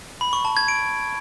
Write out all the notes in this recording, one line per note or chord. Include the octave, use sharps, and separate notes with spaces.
B5
C#6
A5
G#6
D7